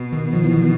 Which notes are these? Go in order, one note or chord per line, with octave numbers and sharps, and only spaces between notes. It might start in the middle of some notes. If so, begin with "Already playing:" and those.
Already playing: B2
D#3
F3
E3
D#3